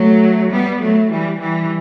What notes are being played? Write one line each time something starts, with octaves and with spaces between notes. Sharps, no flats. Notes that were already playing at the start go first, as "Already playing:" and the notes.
Already playing: F#3 A3
G3 B3
F#3 A3
E3 G3
E3 G3